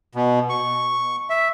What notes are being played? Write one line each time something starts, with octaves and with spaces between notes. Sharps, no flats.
B2
C#6
E5